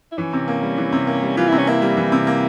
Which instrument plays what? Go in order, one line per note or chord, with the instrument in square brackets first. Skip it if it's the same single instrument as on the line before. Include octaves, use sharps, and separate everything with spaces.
[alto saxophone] E4
[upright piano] E3 [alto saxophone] C#4
[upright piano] C3
A#3
G3
E3
C3
A#3
G3
[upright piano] E3 [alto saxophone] F4
[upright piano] C3 [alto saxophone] E4
[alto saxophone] C#4
[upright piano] A#3 [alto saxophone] E4
[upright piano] G3
E3
C3
A#3